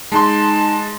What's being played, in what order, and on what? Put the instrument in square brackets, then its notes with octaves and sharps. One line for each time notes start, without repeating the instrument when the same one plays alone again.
[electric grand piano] G#3 C6 [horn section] D#4 A5